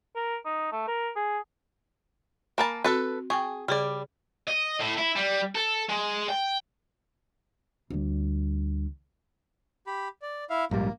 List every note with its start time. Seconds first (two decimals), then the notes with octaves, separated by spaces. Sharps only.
0.16 A#4
0.45 D#4
0.72 A3
0.88 A#4
1.16 G#4
2.58 A#3 A#4 G#5 A5 B5
2.84 C4 F#4 A4 B4
3.30 G#4 G5 G#5 C#6
3.68 C#3 G3 G#4 D5
4.47 D#5
4.80 A2
4.98 E4
5.16 G3
5.55 A4
5.89 G#3
6.29 G5
7.90 D2 G3
9.87 G4 B5
10.22 D5
10.50 E4 E5 F5
10.71 A#1 G#2 G3 A#3